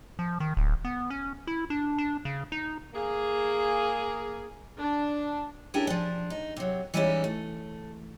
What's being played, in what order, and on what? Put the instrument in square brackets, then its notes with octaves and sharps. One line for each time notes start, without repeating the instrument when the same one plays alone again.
[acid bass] F3
D#3
D1
B3
C#4
E4
D4
D4
C#3
D#4
[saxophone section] A#3 G#4
[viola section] D4
[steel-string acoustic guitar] C#4 D4 E4 G4 G#4 A#4
F3 D4
D#4
C3 F#3
E3 G3 G#3 C#4 D#4 E4
A3